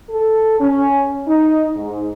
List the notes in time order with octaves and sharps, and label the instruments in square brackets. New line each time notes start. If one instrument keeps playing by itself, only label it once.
[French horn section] A4
C#4
D#4
G#2